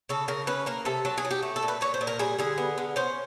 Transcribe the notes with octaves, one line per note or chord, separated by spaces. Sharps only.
C#3 A4
C#3 A#4
C#4 B4
A#3 A#4
C3 A4
F#3 A4
G#4
F#3
G4
A3
A4
A#2
B4
A#2 C#5
C5
A#2
A#4
G3 G#4
D3 G#4
B3
D3
C#4 C5